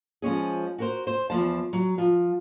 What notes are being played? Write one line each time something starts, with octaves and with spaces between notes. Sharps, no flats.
F3 G#3 C#4 G#4
F#4 A#4 C5
C5
E2 F3 A5
F#3
F3